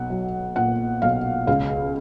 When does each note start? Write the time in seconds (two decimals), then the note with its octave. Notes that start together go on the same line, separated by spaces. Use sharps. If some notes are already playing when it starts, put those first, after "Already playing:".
Already playing: B1 F#5
0.10 F#3
0.56 A#2 F#5
1.02 B1 F5
1.47 C#2 F5